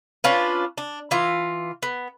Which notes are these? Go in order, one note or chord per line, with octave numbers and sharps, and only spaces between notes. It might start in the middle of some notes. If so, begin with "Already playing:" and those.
C#4 D4 F4 B4
D4
E3 F4
B3